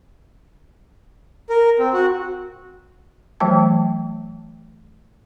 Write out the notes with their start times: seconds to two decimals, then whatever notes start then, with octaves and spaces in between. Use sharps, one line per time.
1.50 A#4
1.79 C4
1.93 F#4
3.40 E3 F#3 A3 G5 A5